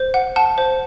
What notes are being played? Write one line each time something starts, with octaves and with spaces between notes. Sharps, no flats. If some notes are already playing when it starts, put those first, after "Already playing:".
Already playing: C5
F#5
F#5 A5
C5